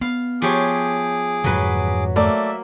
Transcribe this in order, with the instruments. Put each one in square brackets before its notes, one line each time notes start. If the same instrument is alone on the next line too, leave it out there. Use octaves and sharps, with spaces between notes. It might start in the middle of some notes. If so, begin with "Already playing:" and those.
[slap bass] B3 [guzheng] F5
[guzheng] F3 G4 C#5 [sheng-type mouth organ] G#4 D6
[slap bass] F2 G#2 D3 [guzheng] F#3 B4
[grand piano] A3 D5 [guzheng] A#3 [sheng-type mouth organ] E5